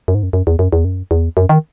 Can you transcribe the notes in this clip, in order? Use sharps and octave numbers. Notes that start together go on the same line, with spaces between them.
F#2
G#2
F#2
F#2
E2
F#2
E2
F#2
E2
F#2
D#3